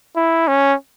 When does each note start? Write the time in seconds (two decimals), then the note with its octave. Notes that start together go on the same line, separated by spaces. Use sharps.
0.16 E4
0.48 C#4